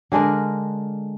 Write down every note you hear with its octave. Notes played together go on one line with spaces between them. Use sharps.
D3 G#3 D4 A#4